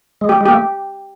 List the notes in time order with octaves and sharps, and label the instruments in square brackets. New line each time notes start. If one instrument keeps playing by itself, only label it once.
[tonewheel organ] G#3
[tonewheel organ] A3 [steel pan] G4
[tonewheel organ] G#3
[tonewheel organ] A#3 [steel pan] G4
[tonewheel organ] A3